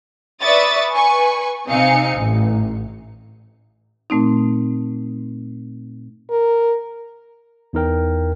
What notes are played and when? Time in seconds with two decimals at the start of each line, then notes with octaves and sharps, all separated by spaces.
0.43 B4 D5 E5 C#6 D#6 A6
0.95 B4 G#5 C#6
1.68 C3 C4 D#4 F5 G#5 C#7
2.17 A1
4.10 A#2 A3 C4 D#4
6.31 A#4
7.73 E2 D#4 A#4 G5